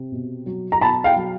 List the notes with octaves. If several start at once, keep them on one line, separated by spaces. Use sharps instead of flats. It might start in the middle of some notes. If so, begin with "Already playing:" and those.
Already playing: C3
B2
F#3
A#5
B2 A5 B5
F5 G5
F#3